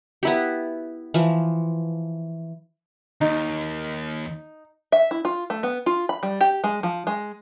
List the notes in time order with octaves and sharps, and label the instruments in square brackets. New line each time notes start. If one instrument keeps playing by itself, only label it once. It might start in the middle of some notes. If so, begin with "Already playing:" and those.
[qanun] B3 E4 G4
E3 F3
[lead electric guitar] D#2 [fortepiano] D#4
[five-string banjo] E5
E4
F4
A3
B3
F4
B5
G3
G4
G#3
F3
G#3